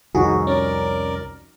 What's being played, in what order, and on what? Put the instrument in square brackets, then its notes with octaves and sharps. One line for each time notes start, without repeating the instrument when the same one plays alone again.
[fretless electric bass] C2 F2 [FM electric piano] D#3 G#4 [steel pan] D#4 F#4
[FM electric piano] C#4 [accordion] A#4 D5